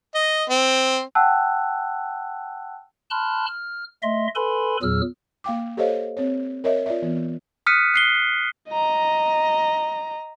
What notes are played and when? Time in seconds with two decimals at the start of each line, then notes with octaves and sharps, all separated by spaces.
0.15 D#5
0.50 C4
1.15 F#5 G5 A5 E6 F#6
3.11 A5 B5 C6 F6 F#6
3.47 F6
4.03 A3 D#5 E5 C6
4.35 A4 B4 G#5 B5 C6
4.82 E2 A#2 F#3 G#4 E6 F6
5.44 A#3 F5 G5 D6
5.77 G4 A4 C5 C#5 D#5 F5
6.17 C4 C#5
6.64 A#4 C#5 D#5 E5
6.86 F4 D5 E5
7.02 E3 B3
7.66 D#6 F6 F#6 B6 C#7 D#7
7.94 F#6 C7 G7
8.70 D#5 A#5